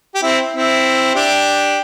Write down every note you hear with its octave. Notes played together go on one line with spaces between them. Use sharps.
G4
C4 E4
C4 E4
D4 G4